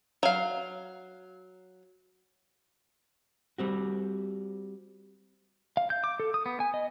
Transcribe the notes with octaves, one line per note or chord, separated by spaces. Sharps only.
F#3 F5
G3 C4 F#4
F5
G6
D6
A4
D#6
B3
G#5
D#5